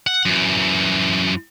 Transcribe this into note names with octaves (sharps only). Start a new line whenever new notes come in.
F#5
F#2 E3